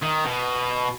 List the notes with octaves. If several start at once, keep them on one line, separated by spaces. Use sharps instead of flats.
D#3
B2